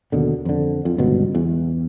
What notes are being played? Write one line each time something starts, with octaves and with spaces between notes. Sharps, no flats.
D#2 B2 D3
F2 D3
F2
G1 C#2 G2 B2
E2